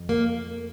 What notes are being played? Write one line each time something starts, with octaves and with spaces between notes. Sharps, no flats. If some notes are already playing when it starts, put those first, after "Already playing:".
Already playing: F2
A#3